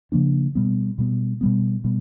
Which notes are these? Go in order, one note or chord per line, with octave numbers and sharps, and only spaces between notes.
C#3 F3 A#3 D4
B2 G3 B3
B2 G3 B3
B2 G3 B3
B2 G3 B3